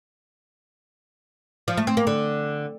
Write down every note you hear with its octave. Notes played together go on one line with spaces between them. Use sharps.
F3
A3
C4
A#3
D3